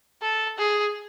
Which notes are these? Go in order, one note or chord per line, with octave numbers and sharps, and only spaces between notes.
A4
G#4